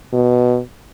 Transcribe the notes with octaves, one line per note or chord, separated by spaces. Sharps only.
B2